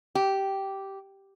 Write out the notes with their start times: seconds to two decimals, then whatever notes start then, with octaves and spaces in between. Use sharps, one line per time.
0.15 G4